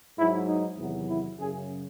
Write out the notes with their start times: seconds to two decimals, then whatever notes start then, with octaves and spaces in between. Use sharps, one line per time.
0.18 G#2 F#3 E4
0.48 D#4
0.78 E2 C3 D#3 F#3
1.08 E4
1.39 F#2 C#3 F#3 G#4